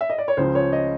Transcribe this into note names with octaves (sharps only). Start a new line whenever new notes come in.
E5
D#5
D5
C#5
C#2 C#3 F3 C5
C#5
D#5